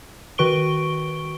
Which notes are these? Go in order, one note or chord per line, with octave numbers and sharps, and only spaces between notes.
D#3 F#4 B4 C#6 D7 G7